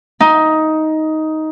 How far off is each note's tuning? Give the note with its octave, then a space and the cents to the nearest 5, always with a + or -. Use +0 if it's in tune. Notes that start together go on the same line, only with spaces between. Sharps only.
D#4 +10